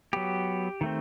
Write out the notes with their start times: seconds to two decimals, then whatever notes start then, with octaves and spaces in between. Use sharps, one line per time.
0.13 F#3 B3 G4
0.81 D#3 A3 C4